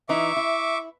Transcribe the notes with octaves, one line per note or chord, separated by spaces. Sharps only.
E3 D#4 E4 E5 C#6 D6
E4